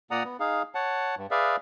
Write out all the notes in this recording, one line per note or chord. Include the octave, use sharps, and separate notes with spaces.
A#2 A#3 D5 F#5 A#5 D#6
B3
D#4 G#4 F5
C#5 F#5 A5
G2
G#4 B4 D5 E5 F5